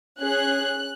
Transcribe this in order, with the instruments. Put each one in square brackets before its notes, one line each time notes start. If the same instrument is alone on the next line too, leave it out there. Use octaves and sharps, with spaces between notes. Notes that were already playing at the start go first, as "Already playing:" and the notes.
[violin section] C#4 G#4 F#6